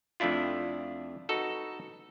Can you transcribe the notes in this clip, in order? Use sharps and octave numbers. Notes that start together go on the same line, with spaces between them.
F2 A3 D4 E4 F4
D#4 F#4 A4 B4